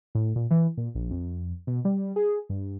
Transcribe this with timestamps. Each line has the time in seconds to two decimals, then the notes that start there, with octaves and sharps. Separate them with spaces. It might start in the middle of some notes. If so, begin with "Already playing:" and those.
0.15 A2
0.36 A#2
0.51 E3
0.77 A#2
0.95 A#1
1.11 F2
1.67 B2
1.85 G3
2.16 G#4
2.49 G2